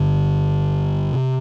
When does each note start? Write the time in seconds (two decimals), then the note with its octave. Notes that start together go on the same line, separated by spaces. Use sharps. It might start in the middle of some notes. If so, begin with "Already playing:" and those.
Already playing: G1 G2 D3
1.13 C3